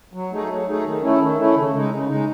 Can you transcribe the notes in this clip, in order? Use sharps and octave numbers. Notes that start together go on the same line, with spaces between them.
F#3
A3 D#4 G#4
F#3
A3 D#4 G#4
D#3
A3 C#4 E4
D#3
A3 C#4 E4
C#3
G#3 D#4
C#3
G#3 D#4